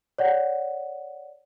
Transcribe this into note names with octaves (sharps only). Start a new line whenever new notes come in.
C#5 D5 F#5